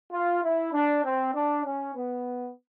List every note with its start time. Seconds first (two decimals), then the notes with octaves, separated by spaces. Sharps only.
0.11 F4
0.43 E4
0.72 D4
1.04 C4
1.34 D4
1.65 C#4
1.95 B3